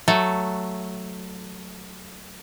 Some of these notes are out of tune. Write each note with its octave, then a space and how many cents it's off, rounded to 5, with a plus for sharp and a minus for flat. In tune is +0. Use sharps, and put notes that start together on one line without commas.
F#3 +0 A3 +0